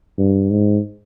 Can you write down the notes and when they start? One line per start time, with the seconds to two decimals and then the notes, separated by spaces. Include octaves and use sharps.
0.18 G2
0.50 G#2